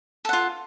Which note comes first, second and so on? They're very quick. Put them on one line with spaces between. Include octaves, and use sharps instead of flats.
A4 F#5 F4